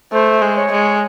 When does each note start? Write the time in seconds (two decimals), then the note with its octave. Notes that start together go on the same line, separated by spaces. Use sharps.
0.13 A3 C5
0.42 G#3
0.57 C#5
0.72 G#3